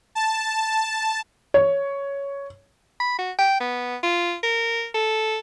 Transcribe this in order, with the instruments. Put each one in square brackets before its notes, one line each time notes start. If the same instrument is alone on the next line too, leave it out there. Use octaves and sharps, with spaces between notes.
[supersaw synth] A5
[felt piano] C#5
[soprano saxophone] B5
F#4
G5
B3
F4
A#4
A4